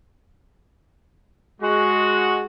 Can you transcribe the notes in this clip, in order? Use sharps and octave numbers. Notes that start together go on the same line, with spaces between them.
G#3 F#4